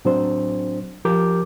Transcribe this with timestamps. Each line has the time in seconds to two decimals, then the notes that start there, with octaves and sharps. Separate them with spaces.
0.05 A2 F#3 C4 D4 C5
1.05 F3 G4 A#4 D6 G6